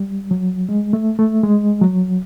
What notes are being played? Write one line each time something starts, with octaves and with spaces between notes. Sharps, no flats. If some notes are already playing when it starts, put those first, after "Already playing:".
Already playing: G3
F#3
G#3
A3
A3
G#3
F#3